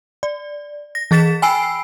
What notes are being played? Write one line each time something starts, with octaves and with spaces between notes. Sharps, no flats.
D5
A#6
E3 G#4 A6 B6 E7
G5 G#5 B5 E6 C7 D7